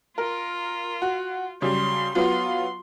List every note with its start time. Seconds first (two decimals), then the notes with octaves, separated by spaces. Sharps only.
0.18 F4 A#4
1.02 F#4
1.62 C#3 F#3 G3 C6
2.15 F#3 B3 F4 C6